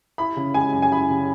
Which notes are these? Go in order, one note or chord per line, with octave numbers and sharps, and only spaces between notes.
E4 B5
C#3
G#3 G#5
F#2
G#5
E4 B5
C#3